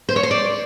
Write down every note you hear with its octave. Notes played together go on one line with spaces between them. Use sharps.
C5
C#5
C5
D5